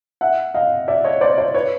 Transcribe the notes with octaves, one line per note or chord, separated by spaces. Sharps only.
E5 F#5
D#5 F5
D5 E5
C#5 D#5
C5 D5
C5 D5
B4 C#5